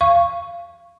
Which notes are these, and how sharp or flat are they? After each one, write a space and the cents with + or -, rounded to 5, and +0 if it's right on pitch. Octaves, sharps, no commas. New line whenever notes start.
F5 -20 C#6 +0